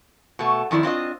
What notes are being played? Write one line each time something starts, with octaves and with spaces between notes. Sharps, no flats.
B2 A3
F2 D#3 E4 D5
C4 D4 F4 D#5